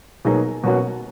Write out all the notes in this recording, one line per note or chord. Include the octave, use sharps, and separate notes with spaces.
B2 F#3 A#3 D#4 G#4
B2 F#3 A#3 C#4 F#4